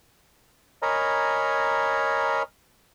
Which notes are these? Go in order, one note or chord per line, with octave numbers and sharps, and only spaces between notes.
A#4 C#5 D#5 G#5 A#5 B5